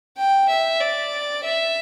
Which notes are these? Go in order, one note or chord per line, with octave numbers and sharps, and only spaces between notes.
G5
E5
D5
E5